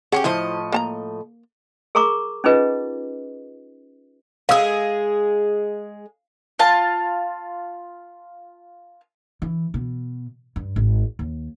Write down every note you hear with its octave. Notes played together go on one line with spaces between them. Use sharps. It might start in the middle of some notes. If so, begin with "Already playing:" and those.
C#4 F4 G4 G#4 F#5
A2 F3 E4 C5 D#5
A#3 A5 A#5
G#4 A#4 A#5 C#6 D6
C#4 D#4 F4 G#4 B4 D#5
G#3 G#4 F5 E6
F4 A5
E3
B2
G2
G#1
D#2